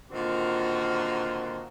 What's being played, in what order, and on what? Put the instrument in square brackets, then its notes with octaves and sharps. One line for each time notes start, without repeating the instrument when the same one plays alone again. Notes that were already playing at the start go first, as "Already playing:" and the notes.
[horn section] A#2 D3 D#3 C4 F4 F#4